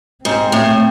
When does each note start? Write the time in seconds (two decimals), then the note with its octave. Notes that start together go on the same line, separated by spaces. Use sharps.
0.24 G#2 C4
0.52 A2